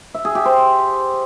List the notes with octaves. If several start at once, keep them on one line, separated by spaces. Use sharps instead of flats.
E5
G#4
G4
C5